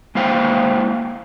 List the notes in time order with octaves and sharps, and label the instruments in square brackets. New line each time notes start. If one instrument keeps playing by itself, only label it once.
[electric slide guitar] G#3 A#3 E4 C5 F5 G5